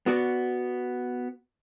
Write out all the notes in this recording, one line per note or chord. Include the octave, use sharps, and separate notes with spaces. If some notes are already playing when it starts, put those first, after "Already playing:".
B3 F#4 D5